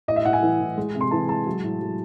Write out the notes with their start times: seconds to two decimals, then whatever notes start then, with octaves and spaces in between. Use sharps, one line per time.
0.08 A2 D#5
0.16 E5
0.24 A2 F#5
0.33 G#5
0.43 E3
0.60 A2
0.77 G#3
0.95 C3
1.01 C6
1.11 E3 A5
1.29 G#3 A5
1.46 F#3
1.64 A2
1.81 F#3